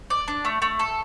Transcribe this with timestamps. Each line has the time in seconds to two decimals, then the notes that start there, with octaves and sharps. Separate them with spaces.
0.10 D5
0.28 D4
0.45 A3
0.62 A3
0.79 A4